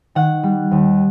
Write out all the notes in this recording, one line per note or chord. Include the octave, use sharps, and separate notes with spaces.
D#3 F#5
G3
D#2